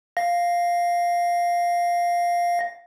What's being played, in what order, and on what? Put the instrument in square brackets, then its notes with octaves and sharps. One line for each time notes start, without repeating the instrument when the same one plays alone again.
[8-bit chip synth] F5 A#6